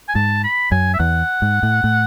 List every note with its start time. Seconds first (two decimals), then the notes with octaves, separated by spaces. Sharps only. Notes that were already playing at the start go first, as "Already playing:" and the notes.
0.08 G#5
0.15 G#2 A5
0.44 B5
0.71 F#2 G#5
0.94 E5
0.99 E2 F#5
1.42 G#2
1.63 A2
1.84 A2